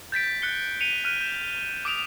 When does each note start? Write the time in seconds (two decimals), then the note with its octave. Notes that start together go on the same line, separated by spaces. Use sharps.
0.12 G6 A6 B6 D7
0.42 F#6 C#7 G7
0.81 C#7 D#7 F7
1.05 F6 F#6 D#7
1.21 G6 E7
1.85 D6 D#6 D7 F7